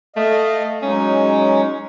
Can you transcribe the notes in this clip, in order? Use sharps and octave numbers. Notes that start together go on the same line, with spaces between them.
A3 D#5 F5
F#3 G#3 C#4 D#4